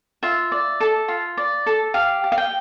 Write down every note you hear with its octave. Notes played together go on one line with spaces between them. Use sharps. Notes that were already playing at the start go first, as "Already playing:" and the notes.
F4 E5
D5
A4
F4
D5
A4
G4 F5
G4
F5
G5